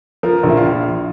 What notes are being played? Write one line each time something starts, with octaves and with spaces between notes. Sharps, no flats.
F3 A#4
A#1
E4
F4